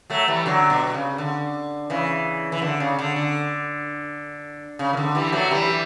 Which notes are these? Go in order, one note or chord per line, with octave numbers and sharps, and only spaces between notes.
F#3 A3
E3 G3
D3 F#3
B2
C#3
D3
C#3 E3
E3
D3
C#3
D3
D3
C#3
E3
D3
E3 G3
F#3 A3
E3 G3